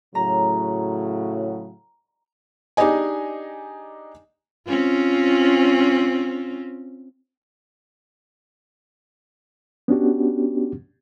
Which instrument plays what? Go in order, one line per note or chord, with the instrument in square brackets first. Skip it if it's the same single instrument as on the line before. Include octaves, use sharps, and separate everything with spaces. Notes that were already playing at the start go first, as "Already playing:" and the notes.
[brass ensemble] A2 C#3 F#3 [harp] A#5
[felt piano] D4 D#4 G4 G#4 D#5 G#5
[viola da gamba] C4 C#4 F4
[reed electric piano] B3 C#4 D4 F#4 G4